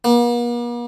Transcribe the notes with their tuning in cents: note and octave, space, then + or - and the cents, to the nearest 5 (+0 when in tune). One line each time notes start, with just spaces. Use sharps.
A#3 +45